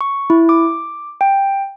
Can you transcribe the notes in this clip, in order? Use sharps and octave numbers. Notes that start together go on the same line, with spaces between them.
C#6
E4
D6
G5